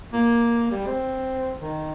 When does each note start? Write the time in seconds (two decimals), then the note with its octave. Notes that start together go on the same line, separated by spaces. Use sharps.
0.13 A#3
0.71 G3
0.86 C4
1.60 D#3